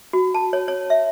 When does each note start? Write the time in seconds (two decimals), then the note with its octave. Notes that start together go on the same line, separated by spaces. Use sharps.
0.13 F#4
0.34 A5
0.53 C#5
0.68 C#5
0.90 E5